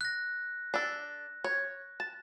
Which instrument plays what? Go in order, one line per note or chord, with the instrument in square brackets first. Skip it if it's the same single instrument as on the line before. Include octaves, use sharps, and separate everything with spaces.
[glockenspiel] F#6 A#6
[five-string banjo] D4 A4
C#5
A5